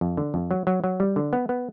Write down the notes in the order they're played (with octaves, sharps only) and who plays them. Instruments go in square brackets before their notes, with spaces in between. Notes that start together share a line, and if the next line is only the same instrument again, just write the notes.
[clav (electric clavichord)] F2
D3
F2
F#3
F#3
F#3
G3
D3
B3
B3